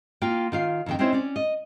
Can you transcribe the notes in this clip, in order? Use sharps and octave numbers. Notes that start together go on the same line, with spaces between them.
A#3 F4 G5
D#3 F4 F5
F2 D#3 G5
C4 C#4 D#4 E4 C5 C#5
C#4 D5
D#5